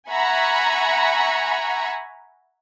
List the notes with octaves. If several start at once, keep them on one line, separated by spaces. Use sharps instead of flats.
E5 F#5 G#5 A#5 B5 C#6